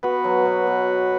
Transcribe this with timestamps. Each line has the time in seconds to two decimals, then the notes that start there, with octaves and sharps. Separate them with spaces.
0.03 B3 F#4 B4
0.24 F#3
0.45 B2
0.67 B2